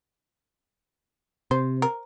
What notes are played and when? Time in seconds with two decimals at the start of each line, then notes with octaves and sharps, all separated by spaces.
1.51 C3 C5
1.82 A#4